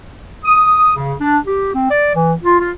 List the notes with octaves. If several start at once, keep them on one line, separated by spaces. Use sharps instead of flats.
D#6
C#3
D4
G4
C4
D5
E3
F4
F4